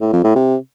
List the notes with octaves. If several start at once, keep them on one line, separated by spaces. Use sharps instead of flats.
A2
F2
A2
C3